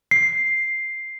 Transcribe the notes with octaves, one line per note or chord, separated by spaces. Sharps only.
C7